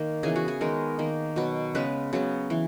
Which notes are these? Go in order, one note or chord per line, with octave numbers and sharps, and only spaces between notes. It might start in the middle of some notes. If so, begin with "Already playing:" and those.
Already playing: D#3 A#3
C#3 E3 B3 G#4
F#4
G#4
D#3 G#3 B3 A#4
D#3 A#3
B2 F#3 B3
C#3 G#3 B3 B4
C#3 F#3 B3
E3